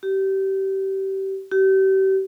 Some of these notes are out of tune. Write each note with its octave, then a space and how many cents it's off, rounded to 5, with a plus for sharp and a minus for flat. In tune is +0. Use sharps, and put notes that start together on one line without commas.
G4 -25
G4 -35